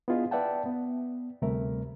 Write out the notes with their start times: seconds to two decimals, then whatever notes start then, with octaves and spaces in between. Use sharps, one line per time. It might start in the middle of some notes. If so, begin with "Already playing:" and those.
0.08 B3 D4 E4 F4 G#4 D#5
0.31 B4 D5 E5 F#5 G5 A5
0.66 B3
1.42 D2 C3 G3 A3 A#4 E5